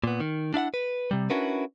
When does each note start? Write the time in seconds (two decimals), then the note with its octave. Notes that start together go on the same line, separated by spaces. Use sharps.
0.04 A#2 B3
0.20 D#3
0.54 D4 E4 F5 F#5
0.74 B4
1.11 C3 G3
1.30 C#4 D4 E4 F#4 A#4 B4